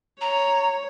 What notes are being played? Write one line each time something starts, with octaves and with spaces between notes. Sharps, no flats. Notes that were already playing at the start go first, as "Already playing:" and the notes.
C#5 A#5